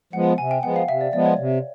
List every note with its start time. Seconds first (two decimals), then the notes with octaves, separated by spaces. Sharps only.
0.13 F3 G#3 B3 F#5
0.38 C3 G#5
0.51 G5
0.63 F3 G#3 B3 F#5
0.76 F5
0.88 C3 E5
1.01 D5
1.13 F3 G#3 B3 D5
1.26 C#5
1.38 C3